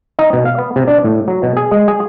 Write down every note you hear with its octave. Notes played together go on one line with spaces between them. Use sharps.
D#4
B2
F5
B3
C3
D4
A2
F#3
B2
G#4
G#3
G#4